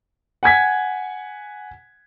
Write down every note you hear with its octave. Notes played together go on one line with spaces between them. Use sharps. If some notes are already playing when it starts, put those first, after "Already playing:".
F#5 G#5 G#6 B6